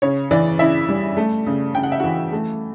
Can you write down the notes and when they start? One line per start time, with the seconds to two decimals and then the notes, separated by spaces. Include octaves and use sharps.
0.02 C#3 C#5
0.31 E3 D5
0.59 C#3 E4 E5
0.89 G3
1.17 A3
1.46 C#3
1.75 C#3 G5
1.83 F#5
1.92 E5
2.00 E3 F#4 F#5
2.32 A3